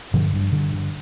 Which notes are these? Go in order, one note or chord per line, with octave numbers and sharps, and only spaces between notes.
G2 D3 F3
G2
G2 D3
D3